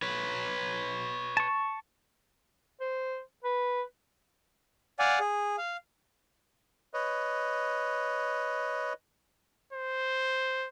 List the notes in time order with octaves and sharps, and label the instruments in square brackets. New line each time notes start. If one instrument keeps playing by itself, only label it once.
[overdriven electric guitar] B4 C#5
[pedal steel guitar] A5 C#6
[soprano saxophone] C5
B4
[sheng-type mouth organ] D5 F5 F#5 G#5
G#4
F5
[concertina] B4 C#5 D#5
[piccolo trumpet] C5